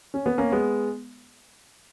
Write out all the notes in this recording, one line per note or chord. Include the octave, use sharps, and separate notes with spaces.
C#4
B3
A#3 C#4
G#3 B3